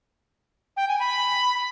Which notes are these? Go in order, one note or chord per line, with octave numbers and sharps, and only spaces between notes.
G5
G#5
B5